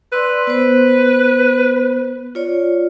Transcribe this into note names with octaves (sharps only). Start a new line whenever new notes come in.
B4 D5 C6 E6
B3 C5
F4 C#5 D5